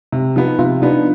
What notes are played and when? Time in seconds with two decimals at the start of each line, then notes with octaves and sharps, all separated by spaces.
0.12 C3
0.36 F3 B3 D#4
0.59 C3 F4
0.82 F3 B3 D4 D#4